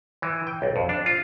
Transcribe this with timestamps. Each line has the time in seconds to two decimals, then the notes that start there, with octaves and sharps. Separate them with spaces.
0.22 E3
0.47 G5
0.62 B1
0.76 F2
0.89 D4
1.06 F4